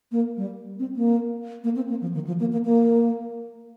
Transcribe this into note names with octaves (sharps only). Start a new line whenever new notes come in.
A#3
G3
C4
A#3
A#3
C4
A#3
F3
D#3
F3
A#3
A#3
A#3